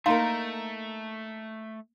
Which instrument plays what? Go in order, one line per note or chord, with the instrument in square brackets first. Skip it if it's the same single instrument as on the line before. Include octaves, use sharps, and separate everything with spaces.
[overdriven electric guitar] A3 [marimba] A#3 C6 [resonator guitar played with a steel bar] D#4 A#4 [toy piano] F5